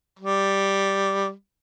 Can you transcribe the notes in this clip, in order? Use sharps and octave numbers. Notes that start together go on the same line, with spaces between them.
G3